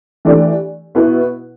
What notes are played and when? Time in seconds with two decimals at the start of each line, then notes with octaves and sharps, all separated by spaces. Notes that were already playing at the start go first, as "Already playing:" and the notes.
0.25 E3 A3 D4 G4 D5
0.95 B2 B3 E4 B4